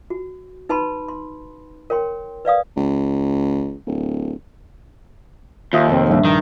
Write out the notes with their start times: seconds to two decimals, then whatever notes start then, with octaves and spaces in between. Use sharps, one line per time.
0.10 F#4
0.69 D#4 B4 A5 B5 C6
1.08 C6
1.90 A#4 C#5 G5 C6
2.45 B4 D5 F5 D#6
2.77 C#2
3.87 D1
5.73 D#2 F4 E5 D#6
5.88 F1 C4
6.10 A#1 G2 E5
6.25 D#3